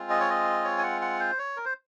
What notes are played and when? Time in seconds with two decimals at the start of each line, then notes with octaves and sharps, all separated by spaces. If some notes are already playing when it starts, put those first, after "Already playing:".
Already playing: G#3 C4 F4
0.10 D#5
0.20 C#5
0.30 D#5
0.64 C#5
0.78 G#5
0.83 F#5
1.01 F#5
1.19 C5
1.39 C#5
1.57 A#4
1.65 C5